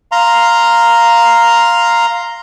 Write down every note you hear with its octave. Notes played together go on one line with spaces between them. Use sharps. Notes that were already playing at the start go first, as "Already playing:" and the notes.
F5 A#5 C6